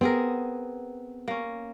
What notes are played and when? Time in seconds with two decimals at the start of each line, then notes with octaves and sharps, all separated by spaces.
0.01 B3 C4 G#4 A#4
1.28 A#3 C#4